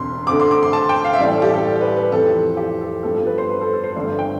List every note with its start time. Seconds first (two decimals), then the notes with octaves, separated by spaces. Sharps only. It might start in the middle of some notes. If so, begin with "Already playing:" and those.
Already playing: E1 D2 C3 C6
0.27 D2 D3 A3 C4 D6
0.40 C6
0.51 D6
0.63 C6
0.73 A5
0.89 G5
1.04 F5
1.13 E5
1.19 A1 A2 G3 C4 D5
1.31 A4
1.42 G4
1.54 A4
1.65 D5
1.81 B4
1.96 B4
2.12 F1 F2 E3 A3 C4 A4
2.57 G4
2.81 A4
3.03 G2 F3 B3 A4
3.15 A4
3.26 B4
3.38 C5
3.49 B4
3.61 A4
3.73 A4
3.84 C5
3.95 G1 G2 D3 A3 C4 D5
4.19 G5